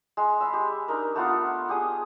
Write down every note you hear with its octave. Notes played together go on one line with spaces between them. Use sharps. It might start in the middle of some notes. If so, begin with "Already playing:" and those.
G#3
E5 B5
G4
D4 D#4 A#4
A3 B3 F4 F#5
G4 G#4 D#6